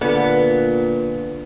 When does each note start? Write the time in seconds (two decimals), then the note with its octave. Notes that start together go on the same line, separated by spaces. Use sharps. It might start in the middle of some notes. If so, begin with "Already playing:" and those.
0.01 A#2 D3 B3